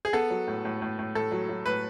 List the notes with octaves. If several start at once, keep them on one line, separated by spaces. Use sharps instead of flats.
G#4
B3 A4
F#3
A2
A2
A2
A2
A2 A4
F#3
F#3
A2 B4